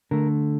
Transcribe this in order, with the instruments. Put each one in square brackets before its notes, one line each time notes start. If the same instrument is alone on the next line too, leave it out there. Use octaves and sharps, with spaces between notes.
[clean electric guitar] D3 A3 A#4